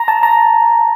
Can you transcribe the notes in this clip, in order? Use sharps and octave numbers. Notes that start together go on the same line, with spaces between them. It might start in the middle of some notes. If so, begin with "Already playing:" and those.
Already playing: A#5
A5
A#5